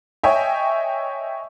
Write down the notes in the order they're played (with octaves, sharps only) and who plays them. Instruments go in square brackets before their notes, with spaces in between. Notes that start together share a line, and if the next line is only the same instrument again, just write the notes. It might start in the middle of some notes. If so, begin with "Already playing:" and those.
[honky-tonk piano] C#5 D#5 E5 G5 G#5